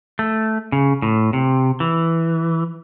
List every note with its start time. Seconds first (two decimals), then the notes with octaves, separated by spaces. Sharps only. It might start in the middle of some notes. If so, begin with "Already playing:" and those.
0.19 A3
0.72 C#3
1.02 A2
1.33 C3
1.80 E3